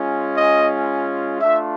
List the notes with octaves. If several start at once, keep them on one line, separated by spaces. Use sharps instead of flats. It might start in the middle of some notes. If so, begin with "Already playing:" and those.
Already playing: G#3 C#4 F4
D#5
A3 D4 F4 E5